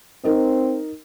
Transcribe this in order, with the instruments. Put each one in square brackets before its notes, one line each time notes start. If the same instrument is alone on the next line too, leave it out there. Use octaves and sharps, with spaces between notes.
[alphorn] C4 [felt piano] D#4 A#4 D#5